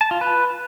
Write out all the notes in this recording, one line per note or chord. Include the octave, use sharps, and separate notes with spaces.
A5
F4
B4